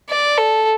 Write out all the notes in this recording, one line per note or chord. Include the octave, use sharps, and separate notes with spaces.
D5
A4